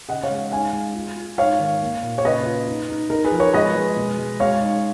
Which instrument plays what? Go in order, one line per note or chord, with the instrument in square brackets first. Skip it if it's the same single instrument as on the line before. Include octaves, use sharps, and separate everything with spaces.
[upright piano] C#3 D#5 F#5
C#5 F5
G#3
D#4 F5 G#5
G#3
F4
F4
G#2 C#5 F5
D#3
A#3
A#2
C#5
C#3 B4 D#5
F4
D#4
D#4
D#4 A#4
G#4 B4
F3
A#4 C#5
G#3 B4 D#5
G#3
B2
G#3
G#3 C#5 F5
D#4